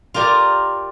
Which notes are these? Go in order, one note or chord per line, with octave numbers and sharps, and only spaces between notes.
F4 G4 A#4 D5